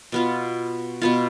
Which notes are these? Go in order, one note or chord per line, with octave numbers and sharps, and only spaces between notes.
B2 B3 F4
B2 B3 F4